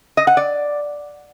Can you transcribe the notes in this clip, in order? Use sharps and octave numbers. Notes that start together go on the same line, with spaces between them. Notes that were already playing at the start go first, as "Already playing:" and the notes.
D#5
F#5
D5